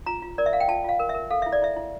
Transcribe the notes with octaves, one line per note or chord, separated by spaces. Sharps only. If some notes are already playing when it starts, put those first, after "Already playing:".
F4 A#5
F4
A#4 D5
E5
A#4 F5
G5
F4 A5
F4 F5
A#4
E5
A#4
A4 F5
E4 E5
D5
E4 E5
E4